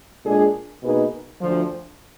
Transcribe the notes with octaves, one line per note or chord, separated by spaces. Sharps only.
A#2 G#3 D4 G#4
B2 A#3 D#4 G#4 B4
D2 D3 F3